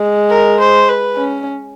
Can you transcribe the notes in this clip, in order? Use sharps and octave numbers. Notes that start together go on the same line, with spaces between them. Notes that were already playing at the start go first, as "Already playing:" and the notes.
Already playing: G#3
A#4
C5
B4
C#4